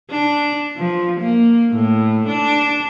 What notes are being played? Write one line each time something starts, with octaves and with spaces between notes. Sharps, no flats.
D4
F3
A#3
A2
D4